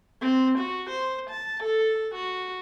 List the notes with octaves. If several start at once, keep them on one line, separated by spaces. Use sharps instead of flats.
C4
F#4
C5
A5
A4
F#4